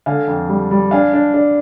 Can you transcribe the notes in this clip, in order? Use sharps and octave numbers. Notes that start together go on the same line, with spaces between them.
D3 F5 G#5
F2
G3
G3
D4 F5 G#5
D4
D4